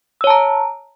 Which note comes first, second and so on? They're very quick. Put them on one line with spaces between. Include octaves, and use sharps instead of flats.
E6 C#5 A5 A#5